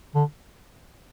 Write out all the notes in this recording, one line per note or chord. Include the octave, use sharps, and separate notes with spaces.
D3